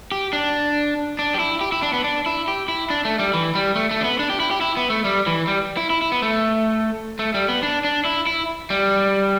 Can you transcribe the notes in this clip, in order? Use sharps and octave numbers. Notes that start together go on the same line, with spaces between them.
G4
D4
D4
G4
E4
G4
E4
D4
B3
D4
E4
G4
E4
D4
A3
G3
E3
G3
A3
A3
D4
B3
D4
G4
E4
G4
E4
B3
A3
G3
E3
G3
E4
E4
E4
B3
A3
A3
G3
B3
D4
D4
E4
E4
G3